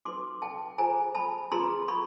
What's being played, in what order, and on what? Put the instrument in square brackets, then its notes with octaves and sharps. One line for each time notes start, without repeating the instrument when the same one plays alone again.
[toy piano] D#4 F#4 B4 C6 D6
G5 A5
F4 G#4 C5 G#5 A#5
A5 B5
F4 G#4 B4 A#5 C6
B5 C#6